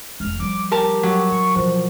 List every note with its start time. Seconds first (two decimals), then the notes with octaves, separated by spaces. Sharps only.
0.20 F1 G#3 F6
0.40 F3 G3 D6
0.72 G4 A#4 A5
1.03 F#3
1.31 C#3 C#6
1.56 B2 E3 F3